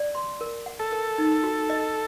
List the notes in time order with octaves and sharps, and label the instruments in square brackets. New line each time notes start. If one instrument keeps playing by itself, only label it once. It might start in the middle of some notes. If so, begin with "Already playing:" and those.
Already playing: [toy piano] D5
C6
A#4
F#5
[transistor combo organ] A4
[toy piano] A#4
D#4
F#4
D#5